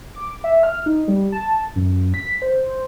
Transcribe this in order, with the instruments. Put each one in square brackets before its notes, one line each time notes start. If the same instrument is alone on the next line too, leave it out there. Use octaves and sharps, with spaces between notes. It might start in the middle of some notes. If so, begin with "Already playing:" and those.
[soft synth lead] D6
E5
F6
D#4
G3
A5
F#2
B6
C5